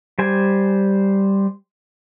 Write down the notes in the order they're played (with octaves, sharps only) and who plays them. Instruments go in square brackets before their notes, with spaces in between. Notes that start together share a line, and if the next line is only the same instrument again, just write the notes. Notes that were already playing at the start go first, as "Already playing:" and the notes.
[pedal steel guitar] G3 C5 G#5